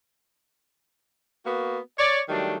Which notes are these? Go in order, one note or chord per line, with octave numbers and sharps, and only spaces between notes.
A#3 B3 F#4
C#5 D5
D#3 F#3 G3 A3 D4